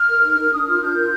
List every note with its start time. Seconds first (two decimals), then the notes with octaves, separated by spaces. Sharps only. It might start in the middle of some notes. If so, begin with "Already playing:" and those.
Already playing: F6
0.09 A#4
0.23 D#4
0.38 A#4
0.53 D4 D#6
0.67 F4 A#4 F6
0.82 D4 G6
0.97 F4 A#4